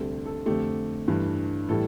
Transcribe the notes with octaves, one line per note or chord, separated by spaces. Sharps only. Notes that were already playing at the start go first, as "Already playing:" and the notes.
Already playing: D2 C3 G3 A4
A4
F2 D3 A3 G4
G2 E3 A3
A2 E3 G3 A4